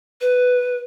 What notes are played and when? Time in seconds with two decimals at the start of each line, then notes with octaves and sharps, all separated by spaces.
0.21 B4